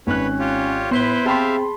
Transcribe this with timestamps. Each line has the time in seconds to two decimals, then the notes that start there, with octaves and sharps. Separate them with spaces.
0.07 G#1 C#4 B4 C#5 F#6
0.39 F4 G4 C#5
0.91 A2 B3 E4 B4 C5 C6 B6 G7
1.26 C4 G4 G#4 E5 F5 A5 B5 C6